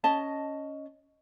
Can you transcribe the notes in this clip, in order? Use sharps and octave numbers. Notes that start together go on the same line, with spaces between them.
C#4 D#5 A5